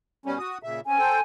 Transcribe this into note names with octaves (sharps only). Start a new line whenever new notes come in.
B2 G3 C#4
F#4 D#6
A#2 C#3 E5
C4 C#4 G#5
A4 C5 G5